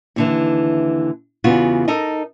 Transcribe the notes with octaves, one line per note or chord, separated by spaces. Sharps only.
D#2 D3 E3
E2 C#3 B3 F4 F#4
D#4 A4 A#4 D#5